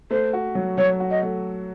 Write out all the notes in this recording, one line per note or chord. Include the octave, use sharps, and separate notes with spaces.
A3 C5
F#4
F#3
F#3 C#5
F#4
D#5
A3